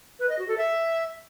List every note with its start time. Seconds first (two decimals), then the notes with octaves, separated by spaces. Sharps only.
0.19 B4
0.29 D#5
0.39 F#4
0.48 A4
0.58 E5